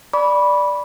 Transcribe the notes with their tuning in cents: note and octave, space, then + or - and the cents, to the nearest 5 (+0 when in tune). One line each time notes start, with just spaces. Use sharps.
D5 +0 B5 -10 D6 -40